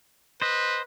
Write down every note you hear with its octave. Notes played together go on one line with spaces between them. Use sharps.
B4 C5 D#5